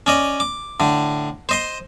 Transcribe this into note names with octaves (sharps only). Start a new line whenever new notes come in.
C#4 D5 D#5
D6
A2 D3
C5 D#5 C6